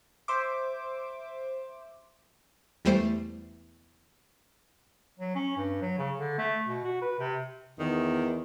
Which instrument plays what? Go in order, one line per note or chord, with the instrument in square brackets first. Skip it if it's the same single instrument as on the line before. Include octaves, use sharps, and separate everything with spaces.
[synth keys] C5 E5 D6
[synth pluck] E2 G3 A3 C5 C6 D7
[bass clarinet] F#3
C#4
G2
F#3
C#3
D3
A3
B2
F#4
B4
C3
[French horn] E2 [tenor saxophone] D#3